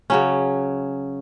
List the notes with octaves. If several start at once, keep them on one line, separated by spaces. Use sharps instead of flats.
C#3 F#3 C#4